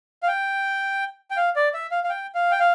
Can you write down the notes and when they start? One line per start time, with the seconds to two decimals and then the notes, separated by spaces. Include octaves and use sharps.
0.23 F5
0.28 G5
1.31 G5
1.37 F5
1.56 D5
1.74 E5
1.91 F5
2.04 F5
2.10 G5
2.35 F5
2.51 G5
2.59 F5